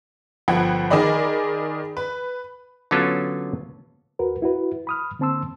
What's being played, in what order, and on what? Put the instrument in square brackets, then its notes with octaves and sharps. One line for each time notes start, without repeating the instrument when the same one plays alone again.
[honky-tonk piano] G1 F3 F#5 G5 B5 G#6
D#3 G#4 A#4 D5 D#5 B5
B4
[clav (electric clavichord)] D3 F#3 B3 C#4 F4 A4
[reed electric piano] D#2 F#4 A#4 B4
E4 F#4 B4
B5 D#6 F6
D3 A#3 C4 A5 C6 E6